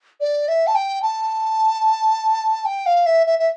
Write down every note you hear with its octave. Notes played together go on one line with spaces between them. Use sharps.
D5
E5
A5
G5
A5
G5
F5
E5
E5
E5